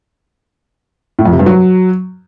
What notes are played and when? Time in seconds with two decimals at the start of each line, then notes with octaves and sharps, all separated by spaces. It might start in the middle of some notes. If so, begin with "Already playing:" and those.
1.19 A2
1.25 F2
1.32 C3
1.39 G2
1.46 F#3